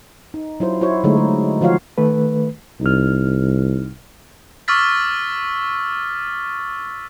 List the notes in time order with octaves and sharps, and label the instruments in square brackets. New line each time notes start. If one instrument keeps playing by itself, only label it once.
[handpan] D#4
F#3 E4 F4 C5
E4 F#4 C5 C#5
D3 F#3 G#3 A3 D#4
G#3 A3
D#3 F3 F4 F#4 C#5 F5
[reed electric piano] D#3 A3 B4
[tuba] C2 [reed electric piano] D#4 F6
[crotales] C#6 D6 E6 F6 A6 B6